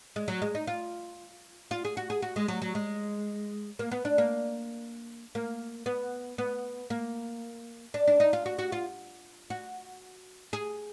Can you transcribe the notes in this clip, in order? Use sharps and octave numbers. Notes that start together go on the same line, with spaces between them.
G#3
F#3
G#3
D#4
F4
F4
G#4
F#4
G#4
F#4
G#3
F#3
F#3
G#3
A#3
B3
D4
A#3
A#3
B3
B3
A#3
D4
D4
D#4
F4
F#4
F#4
F4
F#4
G#4